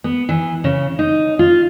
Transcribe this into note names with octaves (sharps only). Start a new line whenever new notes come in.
B3
E3
C#3
D#4
F4